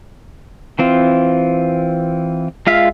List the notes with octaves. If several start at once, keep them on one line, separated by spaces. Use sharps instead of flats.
E3 C4 F4
G#3 F4 E5 F5